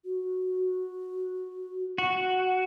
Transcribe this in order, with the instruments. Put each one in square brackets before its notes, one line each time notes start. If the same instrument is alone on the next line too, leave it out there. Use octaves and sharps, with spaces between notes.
[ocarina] F#4
[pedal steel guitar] F#4